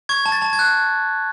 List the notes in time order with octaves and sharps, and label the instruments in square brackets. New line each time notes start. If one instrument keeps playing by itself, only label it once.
[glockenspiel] C#6 G#6
A5
A6
A5
G#6
F#6